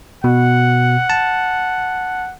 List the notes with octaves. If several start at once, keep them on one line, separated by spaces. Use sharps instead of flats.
B2 F#5
A5